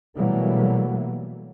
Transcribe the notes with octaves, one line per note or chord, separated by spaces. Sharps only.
B2 E3 F#3 G3 A3 A#3